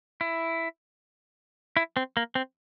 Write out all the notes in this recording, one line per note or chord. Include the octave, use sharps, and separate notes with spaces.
E4
E4
C4
A#3
C4